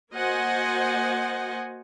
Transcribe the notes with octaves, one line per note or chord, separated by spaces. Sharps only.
A#3 F#4 C5 D#5 F#5 G#5